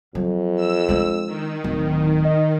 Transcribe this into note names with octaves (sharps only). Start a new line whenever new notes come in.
F2 F#3
E6
G#3 D4
D#3
D1
D#5